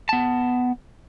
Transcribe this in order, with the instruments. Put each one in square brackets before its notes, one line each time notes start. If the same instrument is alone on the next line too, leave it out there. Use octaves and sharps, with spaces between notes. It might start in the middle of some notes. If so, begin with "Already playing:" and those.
[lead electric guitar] B3 A5